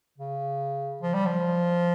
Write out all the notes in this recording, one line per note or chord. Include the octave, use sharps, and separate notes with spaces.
C#3
F3
G3
F3